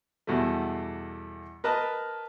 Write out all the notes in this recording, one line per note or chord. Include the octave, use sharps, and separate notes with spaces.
E2 B2 G3 A3
A#4 B4 D#5 A5